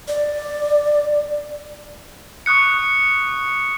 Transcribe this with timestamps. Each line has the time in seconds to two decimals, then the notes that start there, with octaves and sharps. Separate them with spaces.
0.08 D5
2.46 C#6 D#6 F#6 C#7